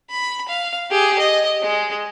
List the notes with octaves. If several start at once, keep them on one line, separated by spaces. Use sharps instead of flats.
B5
F5
G4 G#4
D#5
G#3